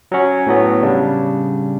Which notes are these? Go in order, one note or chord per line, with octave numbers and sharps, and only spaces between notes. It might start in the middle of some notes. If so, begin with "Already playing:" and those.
F#3 C#4 F#4
A2 F#3 B3
C#3 G3 D4